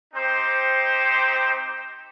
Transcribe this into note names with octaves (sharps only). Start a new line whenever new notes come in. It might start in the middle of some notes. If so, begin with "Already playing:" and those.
C4 D#4 G4 C5